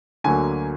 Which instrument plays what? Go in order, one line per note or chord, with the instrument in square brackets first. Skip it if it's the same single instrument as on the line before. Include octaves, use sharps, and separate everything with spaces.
[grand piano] D2 D3 F#3 A#3 G#5